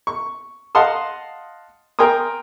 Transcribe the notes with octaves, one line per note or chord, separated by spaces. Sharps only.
C#6
D#5 F5 F#5 A5 C6 D#6
A#4 G5 G#5 C6 D#6